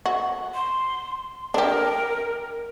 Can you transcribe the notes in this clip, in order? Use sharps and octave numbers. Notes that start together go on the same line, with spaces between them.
F#4
C6
D4 G4 A#4